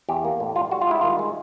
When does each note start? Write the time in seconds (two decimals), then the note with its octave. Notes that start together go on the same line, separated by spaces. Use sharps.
0.09 E2 G4
0.25 A#3
0.40 A2
0.56 G3 F4
0.71 G3 F#4
0.81 F4
0.87 G#3 E4
1.01 D#3 F4
1.19 G#3